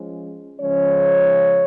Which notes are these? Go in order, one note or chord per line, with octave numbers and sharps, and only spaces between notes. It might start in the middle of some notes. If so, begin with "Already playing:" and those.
Already playing: F3 G#3 C#4
C#3 F3 G#3 C#4 C#5